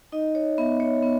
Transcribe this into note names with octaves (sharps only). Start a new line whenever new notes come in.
D#4 D#5
C#5
B3 E5
C#5
B3